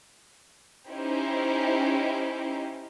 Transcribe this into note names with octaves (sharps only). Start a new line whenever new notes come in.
C#4 D#4 E4 G4 C5